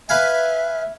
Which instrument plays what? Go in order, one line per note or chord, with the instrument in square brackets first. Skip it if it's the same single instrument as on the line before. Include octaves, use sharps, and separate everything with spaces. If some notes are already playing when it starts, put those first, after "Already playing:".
[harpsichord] B4 F5 G#5 [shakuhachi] E5